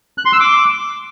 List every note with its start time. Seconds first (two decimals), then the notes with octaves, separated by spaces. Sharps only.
0.18 F#6
0.25 C6
0.33 E6
0.40 D6